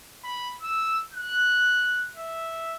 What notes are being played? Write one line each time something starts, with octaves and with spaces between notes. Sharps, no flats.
B5
E6
F#6
E5